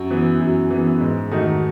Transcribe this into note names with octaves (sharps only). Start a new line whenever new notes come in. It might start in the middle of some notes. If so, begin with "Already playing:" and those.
Already playing: F#2 F#4
E3 B3
F#2
E3
B3
G#2
D#3 A3 D#4 F#4 A4